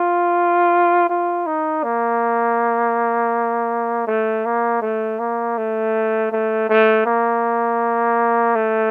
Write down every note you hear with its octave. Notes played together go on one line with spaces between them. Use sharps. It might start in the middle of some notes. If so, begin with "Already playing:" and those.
Already playing: F4
F4
D#4
A#3
A3
A#3
A3
A#3
A3
A3
A3
A#3
A3